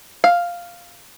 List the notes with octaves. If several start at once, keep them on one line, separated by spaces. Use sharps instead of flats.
F5